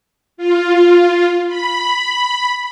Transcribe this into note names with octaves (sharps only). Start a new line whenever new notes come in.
F4
B5